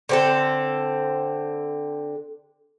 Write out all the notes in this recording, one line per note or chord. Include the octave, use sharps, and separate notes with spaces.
D3 C4 A4